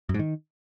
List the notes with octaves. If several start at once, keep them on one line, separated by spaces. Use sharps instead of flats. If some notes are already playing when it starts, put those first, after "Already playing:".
F#2
G#2
D#3